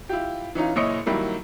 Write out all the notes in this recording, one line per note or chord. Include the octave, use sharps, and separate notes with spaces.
E4 F4 G4
E3 C#4 D#4 F4
F#1 A#2 E4 C#5 D#5 C#7
D#3 F#3 G3 A#3 E4